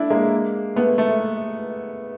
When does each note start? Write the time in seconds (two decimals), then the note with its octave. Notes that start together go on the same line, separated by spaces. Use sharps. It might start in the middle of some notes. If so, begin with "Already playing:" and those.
Already playing: D4 E4
0.10 G#3 A#3
0.76 A3 B3
0.98 A3